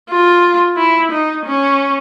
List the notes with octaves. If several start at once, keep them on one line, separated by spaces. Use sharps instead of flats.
F4
E4
D#4
C#4